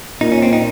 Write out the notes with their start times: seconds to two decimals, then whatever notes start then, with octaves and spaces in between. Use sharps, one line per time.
0.21 A#2 D#4
0.32 C#4
0.42 C4
0.53 D#4